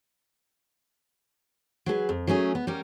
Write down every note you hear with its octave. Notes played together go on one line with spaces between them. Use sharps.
F#3 G#4 A4 B4
F2
F#3 A3 C#4 G#4
B3
G3 C#4 A#4